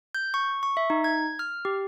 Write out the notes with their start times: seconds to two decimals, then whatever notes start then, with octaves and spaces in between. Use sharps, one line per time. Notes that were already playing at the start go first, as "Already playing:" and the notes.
0.15 G6
0.34 C#6
0.63 C#6
0.77 E5
0.90 D#4
1.04 G#6
1.39 F6
1.65 G4